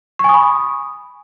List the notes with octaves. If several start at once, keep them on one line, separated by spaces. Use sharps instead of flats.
G#5 B5 C#6 D#6